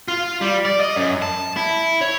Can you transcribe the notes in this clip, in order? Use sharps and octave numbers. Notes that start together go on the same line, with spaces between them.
F4
G3
D5
D#5
F#2
A5
E4
C#5